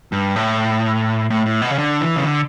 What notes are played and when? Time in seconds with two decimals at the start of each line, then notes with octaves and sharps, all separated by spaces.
0.12 G2
0.36 A2
1.30 A2
1.46 A2
1.62 B2
1.70 C#3
1.78 D3
2.01 E3
2.16 C#3
2.24 D3